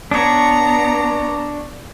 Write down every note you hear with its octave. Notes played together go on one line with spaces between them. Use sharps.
B3 D4 C#5 A#5